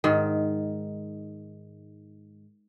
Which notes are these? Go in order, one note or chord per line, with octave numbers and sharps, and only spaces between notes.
G#2 D#3